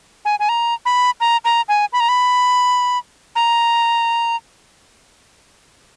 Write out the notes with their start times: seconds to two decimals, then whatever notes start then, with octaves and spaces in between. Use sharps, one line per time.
0.25 G#5
0.40 G#5
0.49 A#5
0.85 B5
1.20 A#5
1.45 A#5
1.69 G#5
1.93 B5
2.00 A#5
2.09 B5
3.36 A#5